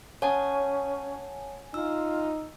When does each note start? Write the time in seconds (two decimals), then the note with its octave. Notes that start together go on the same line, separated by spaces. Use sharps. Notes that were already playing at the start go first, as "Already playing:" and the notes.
0.22 C#4 C#5 F#5 G#5 A5 D#6
1.74 D#4 F4 E6